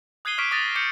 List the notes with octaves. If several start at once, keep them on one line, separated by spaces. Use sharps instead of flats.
D#6 F#6 G#6 C7 D#7 G7
C#6 D6 F6 B6 D7
D6 D#6 A6 A#6 D#7
D6 G6 C#7 D7